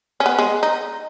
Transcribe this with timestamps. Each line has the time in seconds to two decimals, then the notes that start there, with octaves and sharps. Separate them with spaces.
0.20 C#4
0.26 B3
0.39 G#3
0.63 D#4